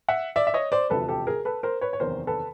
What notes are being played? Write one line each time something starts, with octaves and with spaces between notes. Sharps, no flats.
E5 F#5
D5 E5
E5
C#5 D#5
C5 D5
E1 D2 C3 F3 A4 B4
G4 A4
G#4 A#4
A4 B4
A#4 C5
B4 C#5
C#5
F#1 E2 C3 D#3 A#4 C5
A4 B4